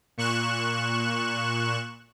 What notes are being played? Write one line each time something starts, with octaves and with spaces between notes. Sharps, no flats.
A#2 C#6 F#6 E7